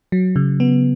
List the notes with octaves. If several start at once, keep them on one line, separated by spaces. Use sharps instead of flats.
F#3
C#3
B3